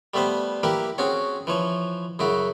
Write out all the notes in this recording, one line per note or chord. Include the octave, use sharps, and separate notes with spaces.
G3 A3 B3 B4 C5
A#3 E4 G4 A#4 B4
C4 C#4 F#4 G#4 C#5
E3 F3 C#5
F#2 C#3 E4 F#4